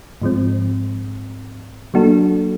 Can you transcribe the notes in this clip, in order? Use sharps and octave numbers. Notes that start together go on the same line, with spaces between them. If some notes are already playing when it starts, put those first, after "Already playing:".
G#2 F3 G#3 C4
F#3 A#3 D4 F#4 A4